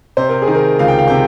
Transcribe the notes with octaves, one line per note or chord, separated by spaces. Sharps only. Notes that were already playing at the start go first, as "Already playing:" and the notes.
C3 C5
A#4
G#4
D#3
A#4
C#2 F5
G5
F5
C3 G5